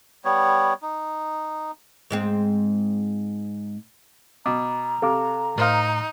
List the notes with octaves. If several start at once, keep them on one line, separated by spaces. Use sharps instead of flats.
G3 B3 C#5
D#4
G#2 G#3 C4
B2 A#5 D6
C3 A4 F5 D6
A2 D#4 A#4 C5 F5